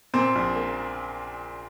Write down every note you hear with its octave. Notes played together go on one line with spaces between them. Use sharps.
A#2 C4
A#1
A#3